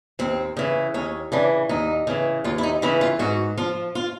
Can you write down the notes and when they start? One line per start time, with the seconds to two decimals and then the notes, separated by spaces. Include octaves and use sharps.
0.19 D#2 C4
0.57 C#3 E3
0.94 D#2 C#4
1.32 C#3 E3 D4
1.69 D#2 D#4
2.07 C#3 E3
2.44 D#2 F4
2.58 E4
2.63 D#4
2.82 C#3 E3 E4
3.01 F4
3.19 G#2 F#4
3.57 F3 F4
3.95 F4